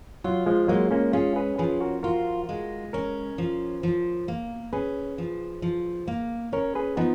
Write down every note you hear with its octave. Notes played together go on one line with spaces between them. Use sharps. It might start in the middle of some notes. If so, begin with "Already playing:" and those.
F#3 F4
F3 G#3
F#3 G#3 A#3
A#3 C#4
C#4 F4 G#4
G#4 B4
F3 G#4 B4
F#4 A#4
F4 F#4 A#4
G#3
C#4 A#4 C#5
F3
F3
A#3
C#4 G#4 B4
F3
F3
A#3
C#4 A#4 C#5
G#4 B4
F3 B3 D#4